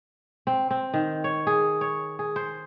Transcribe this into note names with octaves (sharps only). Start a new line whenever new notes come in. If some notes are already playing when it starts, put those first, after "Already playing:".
C4
C4
D#3
C#5
G#4
C#5
G#4
C5